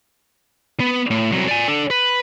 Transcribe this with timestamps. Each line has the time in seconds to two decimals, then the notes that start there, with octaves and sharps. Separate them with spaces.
0.80 B3
1.11 A2
1.32 C2 F#3
1.48 D5 G#5
1.68 D4 A4
1.90 B4